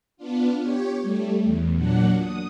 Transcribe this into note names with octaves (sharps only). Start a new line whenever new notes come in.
B3 D4 F4
G4 C#5
G3 A3
E2
A#2 F#3 D4 F#5
D#6